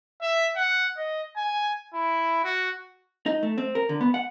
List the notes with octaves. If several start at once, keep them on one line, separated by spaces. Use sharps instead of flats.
E5
F#5
D#5
G#5
E4
F#4
D#4
A3
C4
A#4
D3
B3
F#5